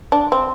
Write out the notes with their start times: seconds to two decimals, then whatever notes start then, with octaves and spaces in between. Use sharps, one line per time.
0.12 D4
0.32 C4